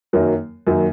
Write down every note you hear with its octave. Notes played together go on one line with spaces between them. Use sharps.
F#2 D#3 F#3 A#3
F#2 D#3 F#3 A#3